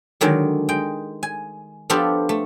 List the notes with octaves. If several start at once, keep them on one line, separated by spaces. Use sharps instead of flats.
D3 D#3 F#3 G#3
G#3 G5
G#5
F3 B3 D4 F4 G4 A4
A3